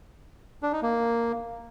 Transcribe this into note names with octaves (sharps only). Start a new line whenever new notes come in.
D4
D#4
A#3